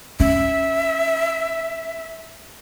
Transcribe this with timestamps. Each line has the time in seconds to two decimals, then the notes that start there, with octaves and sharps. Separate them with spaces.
0.20 C#4 E5